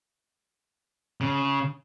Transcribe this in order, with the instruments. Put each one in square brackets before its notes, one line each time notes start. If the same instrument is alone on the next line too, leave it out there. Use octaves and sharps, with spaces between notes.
[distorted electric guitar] C#3